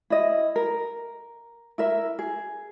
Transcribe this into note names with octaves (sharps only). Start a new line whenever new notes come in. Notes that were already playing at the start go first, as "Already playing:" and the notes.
E4 D#5
A#4
E4 A#4 E5
G#4